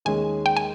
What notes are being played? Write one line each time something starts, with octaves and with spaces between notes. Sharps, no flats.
D#2 D#3 G#3 C#4 G#4 G#5
G5
G#5